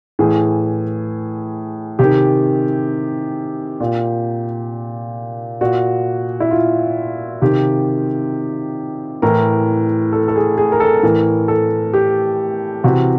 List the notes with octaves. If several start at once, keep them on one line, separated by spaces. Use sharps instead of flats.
A2 E3 G#4
C3 D#3 G4
A#2
A#2 F#4
E4
F4
C3 D#3 G4
A2 E3 A#4
A4
A4
G#4
G#4
A#4
A4
A2 E3 A#4
A4
G4
C3 E3 F#4